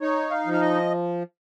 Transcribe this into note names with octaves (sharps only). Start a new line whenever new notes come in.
D#4 C#5
F5
F3
F5
D#5